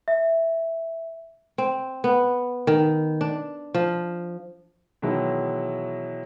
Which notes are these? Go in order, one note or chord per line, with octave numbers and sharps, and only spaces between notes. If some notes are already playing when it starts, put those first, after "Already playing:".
E5
C4
B3
D#3
D4
F3
B2 D#3 E3 F#3 G#3 E4